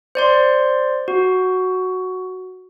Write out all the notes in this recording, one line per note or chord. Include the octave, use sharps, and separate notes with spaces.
C5 D5 C6
F#4